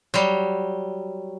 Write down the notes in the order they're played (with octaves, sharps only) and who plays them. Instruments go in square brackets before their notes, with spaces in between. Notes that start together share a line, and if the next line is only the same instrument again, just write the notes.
[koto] F#3 G3